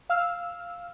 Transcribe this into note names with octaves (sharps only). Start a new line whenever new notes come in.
F5 E6 F6